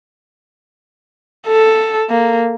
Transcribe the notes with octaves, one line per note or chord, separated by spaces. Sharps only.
A4
A#3